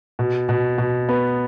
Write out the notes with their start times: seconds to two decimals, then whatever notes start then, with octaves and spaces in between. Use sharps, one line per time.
0.19 B2
0.49 B2
0.78 B2
1.09 B3